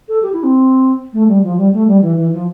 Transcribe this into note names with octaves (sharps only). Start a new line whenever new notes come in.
A4
G4
E4
C4
A3
G3
F3
G3
A3
G3
E3
E3
F3